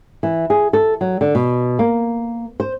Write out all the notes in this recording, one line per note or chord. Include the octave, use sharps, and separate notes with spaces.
E3
G#4
A4
F#3
D3
B2
A#3
C5